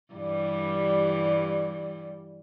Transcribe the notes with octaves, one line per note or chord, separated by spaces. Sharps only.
G2 E3 G3